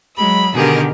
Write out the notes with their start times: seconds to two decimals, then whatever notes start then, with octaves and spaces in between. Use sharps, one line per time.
0.16 F#3 G#3 B5 E6
0.54 B2 D3 D#3 G4 G#4 A#4